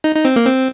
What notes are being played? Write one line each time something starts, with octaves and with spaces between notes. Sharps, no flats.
D#4
D#4
C4
A#3
C4